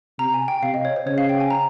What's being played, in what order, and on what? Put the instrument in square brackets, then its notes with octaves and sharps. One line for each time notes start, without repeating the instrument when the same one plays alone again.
[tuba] C3 [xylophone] A#5
[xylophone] G#5
G5
[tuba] C3 [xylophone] F5
[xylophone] D#5
C#5
C5
[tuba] C#3 [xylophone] C#5
[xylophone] F5
G5
G#5
A#5